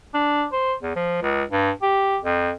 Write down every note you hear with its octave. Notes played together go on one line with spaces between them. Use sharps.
D4
C5
E2
F3
C#2
G2
G4
F2